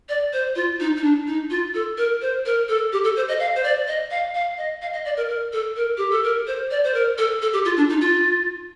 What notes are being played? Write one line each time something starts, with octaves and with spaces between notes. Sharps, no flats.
D5
C5
F4
D#4
D#4
D4
D#4
F4
A4
A#4
C5
A#4
A4
G4
A4
C5
D#5
F5
C5
D5
D#5
F5
F5
D#5
F5
D#5
D5
A#4
A#4
A4
A#4
G4
A4
A#4
C5
D5
C5
A#4
A4
A4
G4
F4
D4
D#4
F4